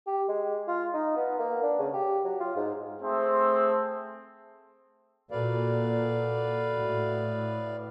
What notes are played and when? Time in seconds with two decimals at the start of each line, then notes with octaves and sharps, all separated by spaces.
0.07 G4
0.28 G#3
0.68 F4
0.94 D#4
1.16 B3
1.39 A#3
1.62 D4
1.79 C#3
1.94 G4
2.25 F#3
2.40 F4
2.56 G#2
3.01 A3 C4 G#4 C5
5.31 A#2 F#4 A4 B4 D5 F5
6.76 A2